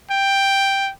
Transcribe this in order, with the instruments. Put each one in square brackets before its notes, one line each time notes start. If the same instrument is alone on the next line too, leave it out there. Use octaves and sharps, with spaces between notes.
[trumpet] G5